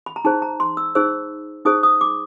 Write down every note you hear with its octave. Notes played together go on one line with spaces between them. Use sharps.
B5
A#5
D#4 G#4 C5 A5
A#5
C6
E6
D#4 G#4 C5 E6
D#4 G#4 C5 D#6
D#6
D6